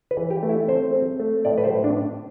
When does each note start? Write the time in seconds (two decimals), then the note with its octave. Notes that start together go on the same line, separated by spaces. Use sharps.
0.11 B4
0.17 E3
0.30 G4
0.43 A3
0.49 E4
0.68 C4 C5
0.94 C4
1.20 A3
1.45 A2 D5
1.58 B4
1.64 C5
1.71 A2
1.84 D4